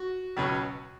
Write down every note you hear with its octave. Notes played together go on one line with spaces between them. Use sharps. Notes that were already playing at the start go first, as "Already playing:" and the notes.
Already playing: F#4
C#2 B2 F#3 C#4